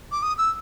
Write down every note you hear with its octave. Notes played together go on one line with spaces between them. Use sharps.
D6
D#6
E6